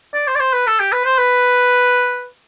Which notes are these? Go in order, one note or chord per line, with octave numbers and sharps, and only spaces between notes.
D5
C5
D5
C5
B4
A4
G4
B4
C5
B4